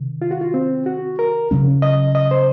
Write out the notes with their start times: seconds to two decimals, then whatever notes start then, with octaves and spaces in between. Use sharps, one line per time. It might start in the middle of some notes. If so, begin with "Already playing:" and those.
Already playing: C3 D#3
0.22 F4
0.31 F#4
0.41 F4
0.54 C4
0.86 F#4
1.19 A#4
1.51 C#3 F#3 C#4
1.82 D#5
2.15 D#5
2.31 C5